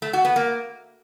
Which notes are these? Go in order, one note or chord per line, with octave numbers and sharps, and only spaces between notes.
A3
F#4
B3
A#3